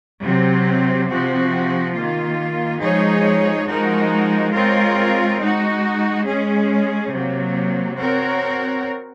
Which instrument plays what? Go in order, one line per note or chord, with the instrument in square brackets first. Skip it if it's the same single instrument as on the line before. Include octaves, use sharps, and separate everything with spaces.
[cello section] C3 F#3 C4
C3 F3 C4 F#4
D#3 A#3 F4
F3 G#3 D#4 G#4 C#5
F3 G#3 D#4 F#4 A#4
G#3 C4 F4 A#4 C#5
G#3 D#4 F#4
G#3 C#4 G#4
C3 F#3 A#3
C4 F#4 A#4 C#5